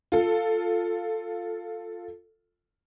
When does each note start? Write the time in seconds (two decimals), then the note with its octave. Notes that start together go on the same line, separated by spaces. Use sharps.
0.12 F4 A4